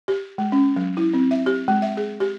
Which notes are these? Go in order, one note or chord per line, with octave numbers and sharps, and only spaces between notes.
G4
G#3
C#4
F#3
E4
C4
E5
G4
G#3
E5
G#4
G4